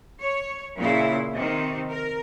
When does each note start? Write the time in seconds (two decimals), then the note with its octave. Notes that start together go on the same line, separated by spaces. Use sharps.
0.20 C#5
0.77 A#2 C#3 E4
1.35 C3 D#3
1.90 A#4